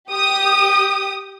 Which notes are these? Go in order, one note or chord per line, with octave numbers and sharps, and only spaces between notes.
G4 D#6